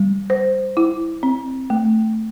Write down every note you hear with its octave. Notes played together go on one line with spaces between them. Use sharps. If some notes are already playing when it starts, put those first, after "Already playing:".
Already playing: G3
C5
E4
C4
A3